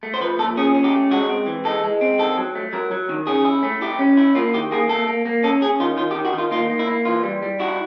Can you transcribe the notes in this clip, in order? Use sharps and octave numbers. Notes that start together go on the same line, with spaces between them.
A3
C5
F3 B4
A#2 A4
C#4 G#4
C#4
G4
A3
G#3 F#4
C4
E3
G#3 A4
G#3
C4
D#3 A4
F#3
A3
F#3 A#4
F#3
D#3
C#4 G#4
E4
A3
E4 G4
C#4
E4
A#3 F4
D#3 G4
A#3 G#4
A#3 A4
A#3
A#3
C#4 A4
C#4 G#4
D#3 F4
D#3 F4
G4
D#3
F#4
D#3
F4
A#3 F4
A#3
E4
A#3
E3 F4
G3
G3
E4 F#4